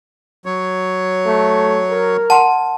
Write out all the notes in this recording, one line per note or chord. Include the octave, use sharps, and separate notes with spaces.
F#3 C#5
A3
A#4
F#5 A5 C6